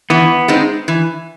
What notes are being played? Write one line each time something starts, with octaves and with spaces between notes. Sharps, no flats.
E3 B3
G#3 C4 D#4
E3